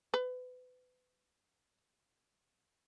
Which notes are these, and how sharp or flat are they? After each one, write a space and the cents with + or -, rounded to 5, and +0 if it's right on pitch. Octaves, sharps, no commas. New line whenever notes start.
B4 +30